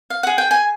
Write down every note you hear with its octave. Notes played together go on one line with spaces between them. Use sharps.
F5
G#4 F#5
G5
G#5